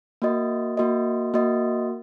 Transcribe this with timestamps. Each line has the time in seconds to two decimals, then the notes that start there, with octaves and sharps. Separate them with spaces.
0.22 A#3 F#4 D#5
0.77 A#3 F#4 D#5
1.34 A#3 F#4 D#5